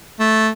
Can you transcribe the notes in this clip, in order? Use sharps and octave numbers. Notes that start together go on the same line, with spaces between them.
A3